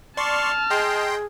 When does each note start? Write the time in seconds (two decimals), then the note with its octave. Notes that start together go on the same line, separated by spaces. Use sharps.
0.17 D5 A5 C6 C#6 F6
0.70 G#4 D#5 G5 C6